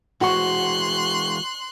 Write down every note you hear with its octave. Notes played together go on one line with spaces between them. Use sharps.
E3 G#3 F#4 C5 F#5 C6 C#6 F#6